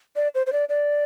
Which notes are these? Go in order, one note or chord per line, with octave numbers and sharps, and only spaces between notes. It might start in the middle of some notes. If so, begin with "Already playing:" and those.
D5
C5
C5
D5
D5